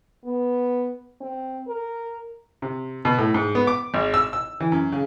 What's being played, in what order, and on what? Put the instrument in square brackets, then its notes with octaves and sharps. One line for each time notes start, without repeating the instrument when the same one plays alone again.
[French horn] B3
C4
A#4
[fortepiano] C3
B2
A2
G#2
B3
D6
G#1
E6
E6
E3
F#2
C#3